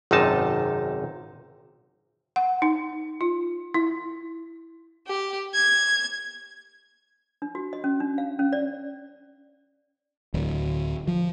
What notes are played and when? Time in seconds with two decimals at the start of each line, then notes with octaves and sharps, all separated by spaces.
0.11 G#1 F#2 C3 D#4 A5
2.36 F#5
2.62 D#4
3.21 F4
3.74 E4
5.06 G4
5.53 G#6
7.42 D4
7.55 F#4
7.73 D#5
7.84 C#4
8.00 D4
8.18 F5
8.39 C#4
8.52 D5
10.34 D1
11.07 F3